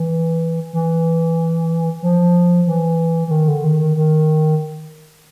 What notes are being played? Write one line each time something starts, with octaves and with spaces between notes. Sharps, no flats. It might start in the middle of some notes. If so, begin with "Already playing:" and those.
Already playing: E3
E3
F3
E3
E3
D#3
D3
D#3
D#3
D#3